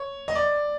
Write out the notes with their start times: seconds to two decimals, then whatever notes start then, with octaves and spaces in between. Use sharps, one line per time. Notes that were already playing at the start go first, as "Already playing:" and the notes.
Already playing: C#5
0.28 D#5
0.35 D5